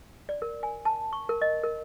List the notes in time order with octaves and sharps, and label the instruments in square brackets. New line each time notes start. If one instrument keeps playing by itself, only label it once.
[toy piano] D5
A#4
G#5
A5
C#6
A#4
D#5
A#4